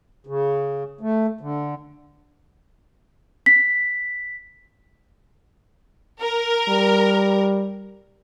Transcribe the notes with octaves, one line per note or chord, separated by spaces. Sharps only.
C#3
A3
D3
B6
A#4
G3